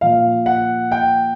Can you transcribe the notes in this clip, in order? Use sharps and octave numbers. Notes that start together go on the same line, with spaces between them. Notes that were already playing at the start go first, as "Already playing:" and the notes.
A#2 F3 F5
F#5
G5